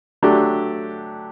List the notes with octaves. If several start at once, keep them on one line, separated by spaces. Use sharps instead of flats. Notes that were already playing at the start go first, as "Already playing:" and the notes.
F#3 A3 D4 G4